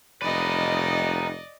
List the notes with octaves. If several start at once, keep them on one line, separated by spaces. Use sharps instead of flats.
F1 D#4 B4 D5 D#5